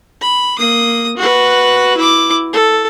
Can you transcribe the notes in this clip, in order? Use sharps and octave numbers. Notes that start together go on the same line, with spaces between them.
B5
A#3 D#6
F#4 B4
E4 D6
A4